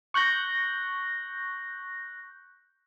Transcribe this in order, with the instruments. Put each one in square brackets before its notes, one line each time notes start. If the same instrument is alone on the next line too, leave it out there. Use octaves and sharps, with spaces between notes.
[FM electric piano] C#6 F#6 G6 A#6